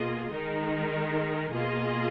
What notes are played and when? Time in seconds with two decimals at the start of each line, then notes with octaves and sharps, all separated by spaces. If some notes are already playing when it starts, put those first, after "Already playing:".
Already playing: B2 A#3 F4 G#4 D#5
0.30 D#3 G#3 D#4 A#4
1.52 B2 A#3 F4 G#4 D#5